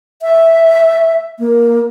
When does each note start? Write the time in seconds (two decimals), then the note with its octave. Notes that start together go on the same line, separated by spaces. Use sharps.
0.22 E5
1.40 A#3